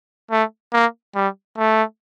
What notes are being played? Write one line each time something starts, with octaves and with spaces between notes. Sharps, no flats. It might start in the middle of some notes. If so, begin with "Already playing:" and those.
A3
A#3
G3
A3